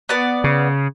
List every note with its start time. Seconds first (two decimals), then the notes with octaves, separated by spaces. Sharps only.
0.09 B3 D5
0.44 C#3